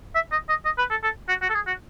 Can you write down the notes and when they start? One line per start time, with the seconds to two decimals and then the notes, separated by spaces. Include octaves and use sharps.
0.15 E5
0.32 D#5
0.49 D#5
0.65 D#5
0.78 B4
0.90 A4
1.03 A4
1.28 F#4
1.42 F#4
1.49 A4
1.54 G#4
1.67 F#4